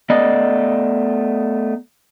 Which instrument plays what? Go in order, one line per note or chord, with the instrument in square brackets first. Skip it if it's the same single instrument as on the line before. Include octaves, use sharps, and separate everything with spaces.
[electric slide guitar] A3 B3 D5 D#5